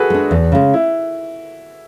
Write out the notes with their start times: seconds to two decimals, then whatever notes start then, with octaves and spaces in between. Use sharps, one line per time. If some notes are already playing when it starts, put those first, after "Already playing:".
Already playing: F#4 G#4 A4 B4
0.10 G#3 D4
0.31 E2
0.52 C#3 G#3
0.74 E4